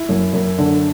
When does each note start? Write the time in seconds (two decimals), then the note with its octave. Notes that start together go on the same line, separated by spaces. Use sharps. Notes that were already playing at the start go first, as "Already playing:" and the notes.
Already playing: E4
0.09 F#2
0.33 F#2
0.58 D3